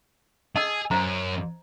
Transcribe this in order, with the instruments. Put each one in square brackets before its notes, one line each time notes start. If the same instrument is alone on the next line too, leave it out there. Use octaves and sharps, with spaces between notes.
[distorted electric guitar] G#4 [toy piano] D#5 A5 E6
[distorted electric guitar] F#2 [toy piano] C5 A#5